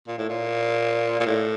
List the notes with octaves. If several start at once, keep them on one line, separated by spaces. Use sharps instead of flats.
A#2
A2
A#2
A#2
A2